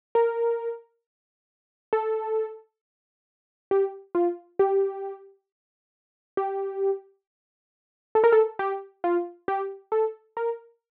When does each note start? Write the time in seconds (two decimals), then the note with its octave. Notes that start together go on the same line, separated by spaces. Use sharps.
0.15 A#4
1.93 A4
3.71 G4
4.15 F4
4.59 G4
6.37 G4
8.15 A4
8.24 A#4
8.32 A4
8.59 G4
9.04 F4
9.48 G4
9.92 A4
10.37 A#4